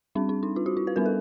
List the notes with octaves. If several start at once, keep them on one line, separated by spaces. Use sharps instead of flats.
G3 C4 D4
D4
D#4
F4
F#4
E4
B4
G3 B3 D4 A#4
A4